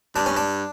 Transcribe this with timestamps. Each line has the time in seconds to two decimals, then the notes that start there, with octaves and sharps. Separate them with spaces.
0.15 G2 D4
0.26 C#4
0.37 D4